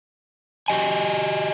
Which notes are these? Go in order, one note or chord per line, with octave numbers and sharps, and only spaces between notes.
F#4 G4 D#5 G#5